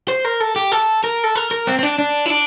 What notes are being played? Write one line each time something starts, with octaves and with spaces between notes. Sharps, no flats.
C5
A#4
A4
G4
A4
A#4
A4
A#4
A#4
C4
C4
D4
D4
E4
D4